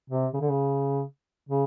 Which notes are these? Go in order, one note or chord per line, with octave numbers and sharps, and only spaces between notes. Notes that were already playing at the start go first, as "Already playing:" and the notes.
C3
C#3
D3
C#3
C#3